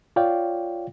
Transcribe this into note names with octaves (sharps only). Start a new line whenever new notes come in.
F4 C#5 D5 F5 G5